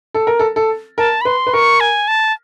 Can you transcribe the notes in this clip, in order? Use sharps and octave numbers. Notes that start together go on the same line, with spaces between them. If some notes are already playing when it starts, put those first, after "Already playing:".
A4
A#4
A4
A4
A#4 A5
B5
B4 C6
B4
A#4 C#6
G#5
A5